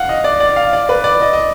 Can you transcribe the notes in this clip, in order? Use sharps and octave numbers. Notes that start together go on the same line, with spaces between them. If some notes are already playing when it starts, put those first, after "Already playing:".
Already playing: F5 F#5
D#5
D5
D5
F5
D5
B4
D5
D#5
D#5